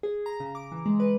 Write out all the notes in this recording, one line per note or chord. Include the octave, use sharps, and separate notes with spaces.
G#4
A#5
C#3
D6
E3
G#3
B4